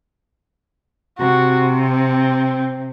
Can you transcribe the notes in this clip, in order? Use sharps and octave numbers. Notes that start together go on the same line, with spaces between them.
C3 F#4
C4